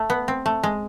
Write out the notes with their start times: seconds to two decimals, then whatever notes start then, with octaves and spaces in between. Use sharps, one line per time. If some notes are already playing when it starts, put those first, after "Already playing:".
Already playing: A3
0.10 B3
0.28 C4
0.46 A3
0.63 G#3